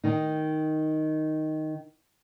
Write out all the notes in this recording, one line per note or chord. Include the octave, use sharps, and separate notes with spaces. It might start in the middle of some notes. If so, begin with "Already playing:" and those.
D#3 D#4